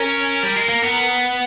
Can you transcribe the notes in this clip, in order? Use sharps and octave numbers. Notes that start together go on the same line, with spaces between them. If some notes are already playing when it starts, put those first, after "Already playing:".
Already playing: C#4 A#4
G3
G#3
A#3
B3